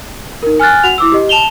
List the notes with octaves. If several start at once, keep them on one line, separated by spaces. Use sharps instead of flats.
D#4 A#4
G#5 F6 F#6 A6
F#4 F#5 F7
E4 D6 E6
G4 D#5
A5 E7 F7 G7